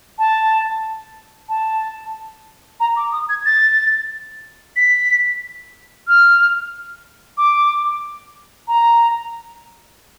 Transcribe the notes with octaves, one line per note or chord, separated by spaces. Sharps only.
A5
A5
A#5
D6
D#6
G#6
A6
B6
F6
D6
A#5